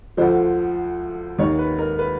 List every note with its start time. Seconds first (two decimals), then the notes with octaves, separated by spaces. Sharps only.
0.17 D2 D3 F3 C5
1.38 D#2 D#3 C#5
1.59 B4
1.78 A#4
1.99 B4